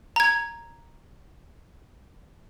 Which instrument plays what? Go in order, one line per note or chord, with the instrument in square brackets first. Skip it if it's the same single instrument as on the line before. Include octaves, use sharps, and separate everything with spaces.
[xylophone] A#5 G#6